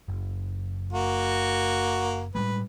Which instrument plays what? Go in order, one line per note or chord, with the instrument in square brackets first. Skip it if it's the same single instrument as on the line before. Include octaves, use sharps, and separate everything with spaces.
[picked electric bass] F#1
[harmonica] A#3 F#4
[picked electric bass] A2 G3 G#3 [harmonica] B4